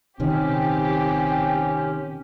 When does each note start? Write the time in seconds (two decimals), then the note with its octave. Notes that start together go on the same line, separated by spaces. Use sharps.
0.20 A#1 C3 D#3 C4 C#4 G4